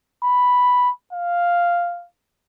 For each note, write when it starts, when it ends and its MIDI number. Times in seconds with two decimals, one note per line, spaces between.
0.23 0.90 83
1.13 2.05 77